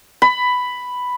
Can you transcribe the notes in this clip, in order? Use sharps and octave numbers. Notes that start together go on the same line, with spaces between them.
B5